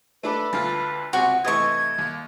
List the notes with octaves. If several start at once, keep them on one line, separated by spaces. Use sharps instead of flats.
A3 D4 A4 B4
D2 D3 F4 A5
C#2 C3 F#4 C#6
C3 E3 A3 D#5 C#6 G#6
D#2